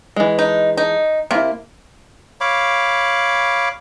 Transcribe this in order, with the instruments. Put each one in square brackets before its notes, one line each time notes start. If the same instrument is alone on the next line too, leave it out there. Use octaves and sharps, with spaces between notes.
[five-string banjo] E3 G#3
[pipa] D#4
D#4
[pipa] C3 [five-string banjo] A#3 E4
[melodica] C#5 F5 B5 D6